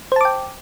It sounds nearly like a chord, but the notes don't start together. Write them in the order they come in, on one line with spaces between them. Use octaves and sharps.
C5 A5 D6 G5